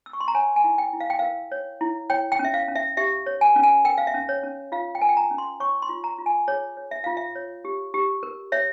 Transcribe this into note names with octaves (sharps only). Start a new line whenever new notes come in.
E6
C#6
C6
A#5
C#5 G#5
G#5
E4
G5
E4
F5
G5
A#4 F5
C#5
E4
C#5 G5
G5
C#4
E5
F5
C#4
E5
G4 E5
C#5
G#5
C#4
G#5
A#4 G5
F5
E5
C#4
C#5
C#4
F4 F5
G5
A#4 G#5
G5
A#5
C#4
C6
C#5 C#6
C6
F4
A#5
F4
G#5
G#4 C#5
C#5
E5
F4 F5
E5
C#5
G4
G4
A#4
C#5 E5